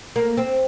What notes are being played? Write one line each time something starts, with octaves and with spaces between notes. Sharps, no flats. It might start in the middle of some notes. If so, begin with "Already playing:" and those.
A#3
C4